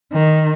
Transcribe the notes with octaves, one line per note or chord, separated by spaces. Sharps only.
D#3